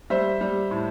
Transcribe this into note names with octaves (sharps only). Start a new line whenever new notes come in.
G3 C5 E5
G3
A2